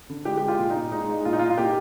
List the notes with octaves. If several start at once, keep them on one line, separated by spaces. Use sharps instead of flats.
D3
G#3 G4
G#3 G4
F4
A#2
D#4
A#2
G#3 D#4
G#3
A#2 F4
D#4
A#2 F4
F4
A#2 G4